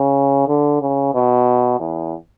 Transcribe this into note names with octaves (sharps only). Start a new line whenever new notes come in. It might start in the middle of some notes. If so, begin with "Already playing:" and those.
Already playing: C#3
D3
C#3
B2
E2